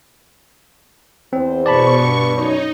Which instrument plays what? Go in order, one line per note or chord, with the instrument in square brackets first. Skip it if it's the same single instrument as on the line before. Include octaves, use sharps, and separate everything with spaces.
[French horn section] E2 C5 [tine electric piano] C4
[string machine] B2 C#6 [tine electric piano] D5 A5 B5
[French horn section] G2
[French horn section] F#2 C#5 [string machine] D#4